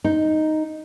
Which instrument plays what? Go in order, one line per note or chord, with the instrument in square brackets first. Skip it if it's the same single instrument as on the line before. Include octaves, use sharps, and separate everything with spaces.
[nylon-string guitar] D#4